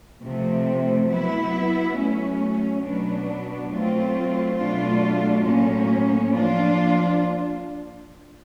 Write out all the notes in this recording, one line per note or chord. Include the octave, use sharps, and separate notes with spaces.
C3 F3 A3
F#3 B3 E4
F#3 A3 C#4
B2 F#3 B3 D4
F#3 A3 C4 F4
B2 F#3 A3 D4 F4
A2 F#3 A#3 C#4
F3 A#3 D4 F4